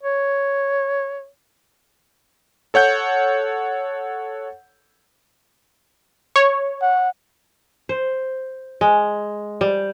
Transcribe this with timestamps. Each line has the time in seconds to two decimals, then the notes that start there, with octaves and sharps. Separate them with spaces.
0.03 C#5
2.74 A4 C#5 F#5 G6
6.36 C#5
6.82 F#5
7.89 C5
8.81 G#3
9.61 G3